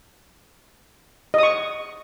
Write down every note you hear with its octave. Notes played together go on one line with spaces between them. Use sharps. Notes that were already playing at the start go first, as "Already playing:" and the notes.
D#5 C#6 D#6